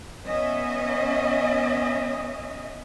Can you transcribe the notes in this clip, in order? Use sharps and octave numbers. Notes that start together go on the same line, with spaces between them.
B3 C#4 D#5 E5